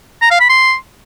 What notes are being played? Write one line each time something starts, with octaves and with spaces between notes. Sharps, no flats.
A#5
F5
B5
C6